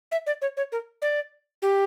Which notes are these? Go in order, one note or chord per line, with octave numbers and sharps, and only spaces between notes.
E5
D5
C#5
C#5
A#4
D5
G4